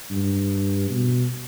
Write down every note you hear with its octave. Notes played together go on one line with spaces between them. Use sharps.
G2
B2